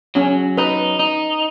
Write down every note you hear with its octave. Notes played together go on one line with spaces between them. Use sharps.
F#3 C#4
D#4 B4
D#4